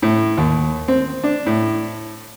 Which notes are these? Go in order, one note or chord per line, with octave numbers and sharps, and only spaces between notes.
A2
D#2
C4
D4
A2